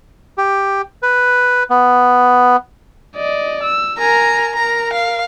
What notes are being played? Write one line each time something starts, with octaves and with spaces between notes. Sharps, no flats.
G4
B4
B3
D5 D#5
E6
A#4 G#5 A#5
A#4 A#5
F5